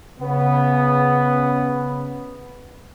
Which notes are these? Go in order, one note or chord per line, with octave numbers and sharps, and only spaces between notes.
C#3 B3